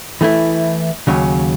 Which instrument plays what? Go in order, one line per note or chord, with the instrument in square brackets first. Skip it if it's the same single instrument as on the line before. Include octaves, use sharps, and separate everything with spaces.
[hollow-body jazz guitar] E3 A3 E4
D#2 C#3 F#3 C#4